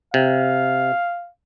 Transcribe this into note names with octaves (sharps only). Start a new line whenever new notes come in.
C3 F5